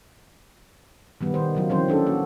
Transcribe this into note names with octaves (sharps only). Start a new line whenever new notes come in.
D#3 G3 B3
D#3 C5
C#3 F#3 F4
D3 E3 F#3 C4 C5
C#4 D4 A4
A#3 F#4